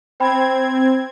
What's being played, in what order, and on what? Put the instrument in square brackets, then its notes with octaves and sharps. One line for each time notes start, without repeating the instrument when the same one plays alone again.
[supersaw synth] C4 G#6 [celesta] C5 G5 B5